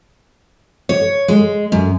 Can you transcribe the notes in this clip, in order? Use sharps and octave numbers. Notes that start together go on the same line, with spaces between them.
C#5
G#3
F#2